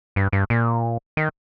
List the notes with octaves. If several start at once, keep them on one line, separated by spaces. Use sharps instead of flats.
G2
G2
A#2
D#3